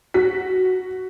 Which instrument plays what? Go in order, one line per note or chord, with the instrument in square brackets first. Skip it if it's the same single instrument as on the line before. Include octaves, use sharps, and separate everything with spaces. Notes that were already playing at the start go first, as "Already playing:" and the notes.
[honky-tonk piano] F#4 B6